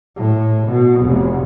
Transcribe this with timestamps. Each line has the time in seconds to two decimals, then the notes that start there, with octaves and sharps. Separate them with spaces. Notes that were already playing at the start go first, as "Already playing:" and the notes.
0.16 A2
0.67 B2
1.00 F1